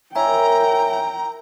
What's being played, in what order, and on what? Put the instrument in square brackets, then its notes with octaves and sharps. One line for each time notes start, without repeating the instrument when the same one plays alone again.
[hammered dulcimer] E4 A#4 [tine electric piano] C#5 E5 G#5 [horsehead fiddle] G5 [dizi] A#5